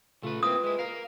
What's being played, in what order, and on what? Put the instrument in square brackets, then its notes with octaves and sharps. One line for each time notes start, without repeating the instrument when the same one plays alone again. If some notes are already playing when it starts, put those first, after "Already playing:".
[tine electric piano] A#2 C#3 F4 [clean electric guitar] A3 B4
[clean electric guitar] A#3 C4 E4 [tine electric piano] F4 [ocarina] B4 [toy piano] D#6
[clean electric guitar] G#3 E4
A#4 F5